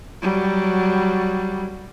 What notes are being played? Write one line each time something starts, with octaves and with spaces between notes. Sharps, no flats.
F#3 G3